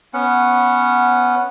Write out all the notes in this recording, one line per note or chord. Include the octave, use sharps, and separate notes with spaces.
B3 C#4 F#5